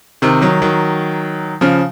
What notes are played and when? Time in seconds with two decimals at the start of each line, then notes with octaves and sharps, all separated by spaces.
0.22 C3 D#3
0.41 D#3 F#3
0.62 D#3 F#3
1.61 C#3 F3